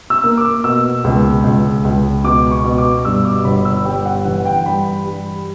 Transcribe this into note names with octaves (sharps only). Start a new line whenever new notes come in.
E6
A#3
D6
B2 E6
C#2
C#2
C#2
B2 D6
C#6
B2
D6
G2 E6
D6
G1 B5
E6
G3 G5
F#5
E3 F#5
G5
G2 B5
G3